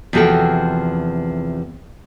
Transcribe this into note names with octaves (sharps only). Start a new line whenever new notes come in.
E2 C3 F3 F#4 A4 G5